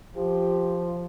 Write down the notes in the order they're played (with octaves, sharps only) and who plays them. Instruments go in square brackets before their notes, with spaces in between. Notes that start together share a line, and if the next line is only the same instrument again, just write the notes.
[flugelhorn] F3 [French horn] G4